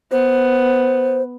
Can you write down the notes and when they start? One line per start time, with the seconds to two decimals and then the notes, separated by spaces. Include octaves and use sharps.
0.12 B3 C5